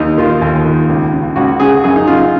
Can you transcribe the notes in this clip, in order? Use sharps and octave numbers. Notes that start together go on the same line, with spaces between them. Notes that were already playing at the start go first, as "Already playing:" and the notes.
Already playing: D#2 D#4
D#3 F4
D#2
D#3
C#2
C#3
C#2 F#4
C#3 G#4
F#2 G#4
D#4
C#3 F4